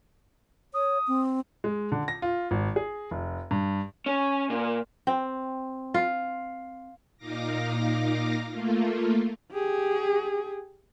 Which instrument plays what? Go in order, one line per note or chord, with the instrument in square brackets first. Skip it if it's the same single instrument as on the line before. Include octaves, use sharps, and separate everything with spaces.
[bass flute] C#5 [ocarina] D#6
[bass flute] C4
[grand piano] G#3
D3
A#6
F4
G#1
G#4
F1
G2
[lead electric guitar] C#4
A#2
[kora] C4
F4
[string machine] A#2 D#4 F5 D6 A#6
A3 A#3 F4
[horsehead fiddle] G4 G#4